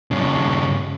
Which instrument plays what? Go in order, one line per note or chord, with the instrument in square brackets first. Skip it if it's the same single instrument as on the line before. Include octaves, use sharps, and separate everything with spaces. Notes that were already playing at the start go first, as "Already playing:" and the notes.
[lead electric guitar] G2 C#3